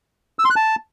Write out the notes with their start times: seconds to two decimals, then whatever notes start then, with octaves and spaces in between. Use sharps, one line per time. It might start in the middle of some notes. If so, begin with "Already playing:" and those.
0.39 E6
0.45 C6
0.50 F#6
0.56 A5